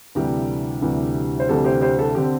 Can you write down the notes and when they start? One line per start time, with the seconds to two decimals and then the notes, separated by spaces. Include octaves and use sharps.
0.15 D2 C3 E3 G3 G4
0.82 D2 C3 E3 G3
1.40 C5
1.49 D2 C3 E3 G3 A4
1.64 G4 C5
1.81 G4 C5
1.99 A4
2.15 D3 C4 G4